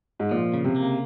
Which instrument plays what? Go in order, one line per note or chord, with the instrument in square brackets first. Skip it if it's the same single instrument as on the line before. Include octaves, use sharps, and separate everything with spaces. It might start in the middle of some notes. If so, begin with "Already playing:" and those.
[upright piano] G#2
[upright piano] A#2 [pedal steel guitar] F3
[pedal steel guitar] C#3
[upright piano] C3
[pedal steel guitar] A#3